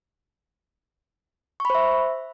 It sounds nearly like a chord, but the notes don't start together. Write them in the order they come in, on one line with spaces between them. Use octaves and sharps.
C#6 B5 C5 E5